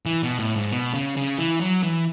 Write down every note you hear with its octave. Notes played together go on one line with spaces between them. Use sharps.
E3
B2
A2
G#2
B2
C#3
C#3
E3
F#3
E3